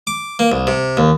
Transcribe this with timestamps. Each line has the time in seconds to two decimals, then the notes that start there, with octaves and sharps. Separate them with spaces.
0.07 D6
0.39 A#3
0.52 C2
0.67 C3
0.97 D#2